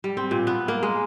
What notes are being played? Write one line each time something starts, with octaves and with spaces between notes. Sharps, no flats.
G3
C4
A#2
B3
A#3
G#3